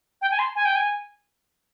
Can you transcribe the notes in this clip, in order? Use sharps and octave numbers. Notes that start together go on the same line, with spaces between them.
G5
G#5
C6
G#5
G5
G#5